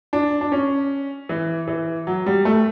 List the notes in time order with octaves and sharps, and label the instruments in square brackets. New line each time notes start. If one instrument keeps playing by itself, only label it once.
[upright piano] D4
D4
C#4
E3
E3
F#3
G3
A3